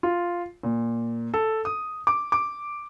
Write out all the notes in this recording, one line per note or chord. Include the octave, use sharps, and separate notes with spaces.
F4
A#2
A4
D#6
D6
D6